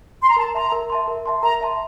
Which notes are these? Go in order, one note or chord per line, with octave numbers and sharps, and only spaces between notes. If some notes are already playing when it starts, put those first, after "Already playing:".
C6
A#5
A#4 A5
E5 A5 A#5 C6
A#4
E5 A5 C6
A#4
E5 A5 C6
A#4 A#5
E5 A5 C6